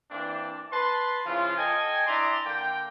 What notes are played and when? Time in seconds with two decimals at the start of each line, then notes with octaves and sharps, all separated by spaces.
0.11 E3 A#3 C4 D4
0.72 B4 A5 C6
1.26 C#3 F3 E4 F4
1.57 A4 D#5 G5 G#5
2.07 D4 E4 D5 A#5 C6
2.46 D3 A#3 G5